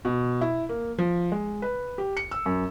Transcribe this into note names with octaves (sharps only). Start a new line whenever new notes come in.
B2
E4
A#3
F3
G#3
B4
G4
C#7
E6
F#2